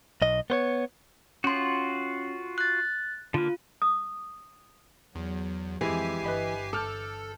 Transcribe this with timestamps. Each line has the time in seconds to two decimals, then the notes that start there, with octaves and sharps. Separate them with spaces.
0.22 B1 D#5
0.50 B3 C5 C#5
1.44 C#4 F4 F#4 C6
2.58 F#6 A6
3.34 D3 A#3 F4
3.82 D#6
5.15 E2 F#3
5.81 F2 E3 G#3 E4 G4 G#5 C7
6.24 G1 B4 D#5 B5
6.73 A4 A5 D6 F6 G6